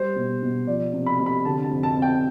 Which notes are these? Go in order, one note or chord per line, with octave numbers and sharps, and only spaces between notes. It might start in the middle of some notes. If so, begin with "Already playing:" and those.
Already playing: G3 C5
B2
B2
F3 D5
C3
B5
C3
B5
D3 A5
A5
F2
A5
C4
G5